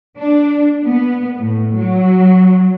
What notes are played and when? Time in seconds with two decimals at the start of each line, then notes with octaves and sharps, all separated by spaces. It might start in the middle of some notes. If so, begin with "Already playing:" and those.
0.17 D4
0.84 B3
1.38 A2
1.74 F#3